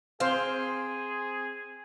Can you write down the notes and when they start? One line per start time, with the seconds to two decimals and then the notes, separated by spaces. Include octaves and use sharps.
0.20 C4 G#4 C5 F5